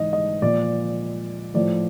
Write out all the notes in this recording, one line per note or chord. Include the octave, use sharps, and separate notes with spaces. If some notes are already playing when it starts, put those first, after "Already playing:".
Already playing: G#2 E3 D#5
D#5
A#2 F3 D5
A2 F3 D5